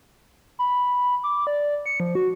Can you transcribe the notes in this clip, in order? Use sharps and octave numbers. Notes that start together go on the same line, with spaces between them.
B5
D6
D5
C#7
F3
F#4